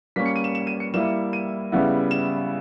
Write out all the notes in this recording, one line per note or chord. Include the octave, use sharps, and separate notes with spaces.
G3 A#3 C#4 B6
C#7
D#7
E7
E7
D#7
C#7
G3 A#3 E4 E7
D#7
C#3 G3 B3 E4
E7